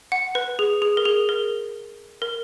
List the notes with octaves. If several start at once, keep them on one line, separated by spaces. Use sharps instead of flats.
F#5
B4
G#4
G#4
A#4
G#4
A#4
A#4